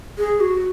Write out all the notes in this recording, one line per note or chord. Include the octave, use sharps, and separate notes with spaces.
G#4
F#4